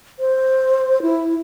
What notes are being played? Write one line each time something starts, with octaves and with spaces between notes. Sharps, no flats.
C5
E4